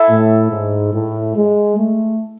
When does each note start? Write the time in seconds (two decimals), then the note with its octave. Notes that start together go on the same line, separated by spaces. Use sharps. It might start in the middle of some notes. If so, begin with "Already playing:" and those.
Already playing: E4 A4 E5 G#5
0.10 A2
0.51 G#2
0.94 A2
1.36 G#3
1.78 A3